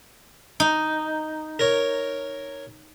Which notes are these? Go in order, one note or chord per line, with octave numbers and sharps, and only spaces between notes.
D#4
A#4 C#5